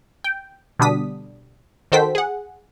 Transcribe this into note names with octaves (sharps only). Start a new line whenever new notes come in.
G5
B2 D3 G3 D4 D#6 B6
D#3 F#4 A4 C5 G5 B6
G#4 F#5